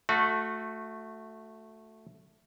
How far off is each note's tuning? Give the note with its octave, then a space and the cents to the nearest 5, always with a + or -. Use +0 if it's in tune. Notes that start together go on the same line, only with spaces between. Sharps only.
A3 +0 F#4 -25